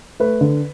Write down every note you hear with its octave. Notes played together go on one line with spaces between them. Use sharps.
A3 B4
D3